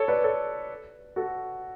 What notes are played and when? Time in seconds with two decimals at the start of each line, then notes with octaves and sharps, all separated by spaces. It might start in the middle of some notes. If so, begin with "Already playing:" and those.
Already playing: A4 C#5
0.08 B4 D5
0.23 A4 C#5
1.16 F#4 A4